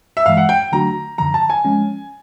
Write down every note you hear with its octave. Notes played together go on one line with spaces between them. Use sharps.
E5
G2 E3 G#3 F5
F#5
G5
D3 F#3 A3 D4 F#4 A#5
F#2 D3 F3 A#5
A5
G#5
F3 G#3 C#4